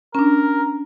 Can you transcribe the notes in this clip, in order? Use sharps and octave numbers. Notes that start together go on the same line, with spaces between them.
C#4 D4 A#4